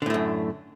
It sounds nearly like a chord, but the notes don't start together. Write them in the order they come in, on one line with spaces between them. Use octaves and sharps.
D3 A2 A3 F#2